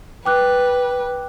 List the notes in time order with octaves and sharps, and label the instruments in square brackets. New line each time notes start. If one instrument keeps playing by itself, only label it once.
[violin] B4 [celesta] G5 D6 F#6